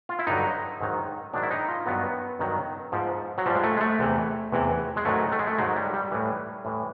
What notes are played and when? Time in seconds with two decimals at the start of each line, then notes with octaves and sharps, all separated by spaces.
0.09 F4
0.19 E4
0.27 G2 D3 F#3 D#4
0.81 G#2 D#3 F#3
1.33 G#2 D#3 F#3 D4
1.43 E4
1.51 D#4
1.68 F4
1.86 G2 D#3 F#3 B3
2.39 G2 D#3 F#3
2.92 G#2 F3
3.38 F#3
3.46 G#2 F3 G3
3.55 G#3
3.64 A3
3.77 G#3
3.81 A3
3.99 E2 C3 E3
4.52 E2 C3 E3
4.96 G#3
5.05 G#2 D#3 F#3 A3
5.32 A3
5.39 G#3
5.47 A3
5.58 G#2 D#3 F#3 G#3
5.76 G3
5.93 G3
6.11 A2 E3
6.65 A2 E3